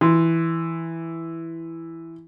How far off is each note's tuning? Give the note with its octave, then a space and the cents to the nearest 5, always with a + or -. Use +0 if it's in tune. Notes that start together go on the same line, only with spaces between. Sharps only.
E3 +0 C6 -10